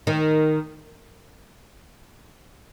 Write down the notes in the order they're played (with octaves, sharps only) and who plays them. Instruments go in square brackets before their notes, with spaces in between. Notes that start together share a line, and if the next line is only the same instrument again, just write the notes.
[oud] D#3